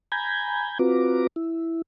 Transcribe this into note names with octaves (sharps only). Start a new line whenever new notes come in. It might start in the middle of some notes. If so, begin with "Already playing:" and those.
G#5 A#5 B5 G6 G#6
C4 F4 F#4 B4 A#5 D6
E4